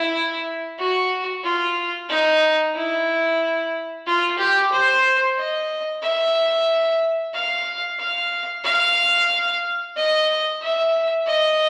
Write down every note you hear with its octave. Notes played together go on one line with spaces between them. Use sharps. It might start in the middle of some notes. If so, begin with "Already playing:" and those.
Already playing: E4
F#4
F4
D#4
E4
F4
G4
C5
D#5
E5
F5
F5
F5
D#5
E5
D#5